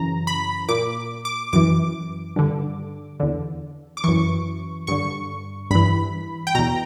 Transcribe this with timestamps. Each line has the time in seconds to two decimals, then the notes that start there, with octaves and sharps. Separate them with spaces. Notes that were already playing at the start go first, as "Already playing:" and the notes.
Already playing: F#2 C#3 E3 A#5
0.27 B5
0.69 A#2 D6
1.25 D6
1.53 F#2 E3 D6
2.36 G2 D3
3.20 E2 D3
3.97 D6
4.04 F#2 E3 C#6
4.87 G2 D3 C#6
5.71 G2 E3 B5
6.47 G5
6.55 E2 B2 A#5